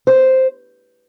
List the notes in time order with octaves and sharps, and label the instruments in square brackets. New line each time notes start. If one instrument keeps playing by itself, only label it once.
[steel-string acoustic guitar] C5